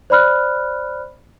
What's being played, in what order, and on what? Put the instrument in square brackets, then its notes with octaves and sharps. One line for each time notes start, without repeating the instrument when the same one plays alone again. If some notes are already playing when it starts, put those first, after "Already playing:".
[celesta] C5 D5 B5 F6 F#6